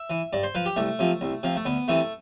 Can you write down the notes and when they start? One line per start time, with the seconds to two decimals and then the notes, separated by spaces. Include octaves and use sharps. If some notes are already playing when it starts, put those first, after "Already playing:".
Already playing: E5
0.10 E3
0.33 G2 D5
0.43 C5
0.55 F3 B4
0.66 G4
0.76 C2 A3
0.99 C3 F3
1.21 C2
1.43 C3 F3
1.56 A3
1.65 D2 B3
1.88 C3 E3 A3